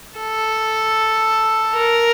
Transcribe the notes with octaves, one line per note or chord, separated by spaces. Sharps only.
A4
A#4